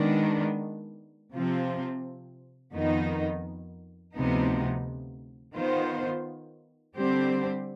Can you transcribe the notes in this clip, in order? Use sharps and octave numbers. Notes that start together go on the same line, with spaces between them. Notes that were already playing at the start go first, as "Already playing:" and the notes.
Already playing: D#3 G#3 B3 D4
C3 F3 C4 F4
F2 D#3 B3 D#4
D2 C3 F3 B3 D#4
D#3 B3 F4 C5
D3 G3 C4 G4 C5